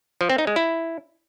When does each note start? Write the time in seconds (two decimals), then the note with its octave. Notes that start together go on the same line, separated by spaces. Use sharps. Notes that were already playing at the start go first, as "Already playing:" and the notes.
0.21 F3
0.30 C4
0.38 D#4
0.47 G#3
0.56 E4